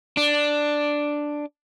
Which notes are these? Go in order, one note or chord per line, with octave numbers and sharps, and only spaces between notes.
D4